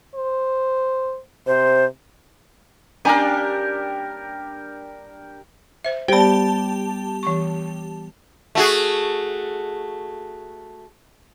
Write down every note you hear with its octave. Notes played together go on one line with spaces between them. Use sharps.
C5
C3 C5
G3 A#3 C#4 D4 G4 A#4 G#5 A#5
C5 E5
G3 B3 G4 C5 D5 A5
E3 C#6
A3 F#4 G#4